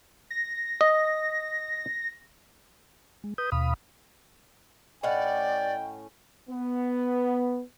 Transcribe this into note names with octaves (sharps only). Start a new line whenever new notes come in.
A#6
D#5
G#3
B4 D#6 G6
D#2 B2 F5 B5 D#6
A2 C#4 D5 D#5 F#5 G5
B3